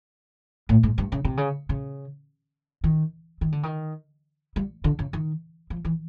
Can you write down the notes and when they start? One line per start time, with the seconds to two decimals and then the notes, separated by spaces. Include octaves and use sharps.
0.69 A2
0.83 G#2
0.98 G2
1.12 C#3
1.25 C3
1.37 C#3
1.69 C#3
2.84 D#3
3.41 D#3
3.52 D3
3.63 D#3
4.56 G3
4.84 D3
4.99 C#3
5.13 D#3
5.70 F3
5.85 E3